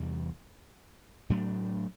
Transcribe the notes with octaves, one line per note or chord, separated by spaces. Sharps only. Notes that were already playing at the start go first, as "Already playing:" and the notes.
Already playing: E2 C3 E3 G3
A2 F#3 A3 D4